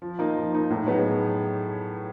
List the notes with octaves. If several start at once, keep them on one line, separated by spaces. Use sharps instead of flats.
F3
A#3 D#4
F3
A#3 D#4
A2
F#3 B3 D#4 G#4